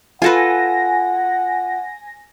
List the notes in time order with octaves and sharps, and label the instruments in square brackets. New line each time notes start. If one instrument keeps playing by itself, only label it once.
[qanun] F4 A4 B4 [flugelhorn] F#5 [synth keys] G#5 A#6